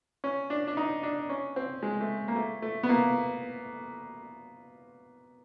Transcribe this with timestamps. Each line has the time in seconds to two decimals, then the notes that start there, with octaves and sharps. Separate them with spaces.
0.24 C#4
0.50 D4
0.67 D4
0.77 D#4
1.03 D4
1.29 C#4
1.56 C4
1.83 G#3
2.01 A3
2.28 A#3
2.36 A3
2.62 A3
2.83 B3
2.89 A#3